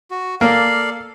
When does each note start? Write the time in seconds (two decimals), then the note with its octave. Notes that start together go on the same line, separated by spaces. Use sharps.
0.11 F#4
0.41 A#3 A4 D5 F5